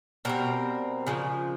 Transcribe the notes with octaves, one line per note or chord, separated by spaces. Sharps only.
B2 G3 C4 A#4
C#3 F3 G#3